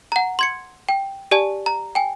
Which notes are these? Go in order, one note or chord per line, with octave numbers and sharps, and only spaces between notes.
F#5 A#5
C6 G#6 C#7
G5
G4 D5 G#5 A5
A#5
G5 G#5